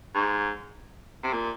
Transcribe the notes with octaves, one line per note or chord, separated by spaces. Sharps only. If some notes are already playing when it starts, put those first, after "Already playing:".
G#2
C3
A#2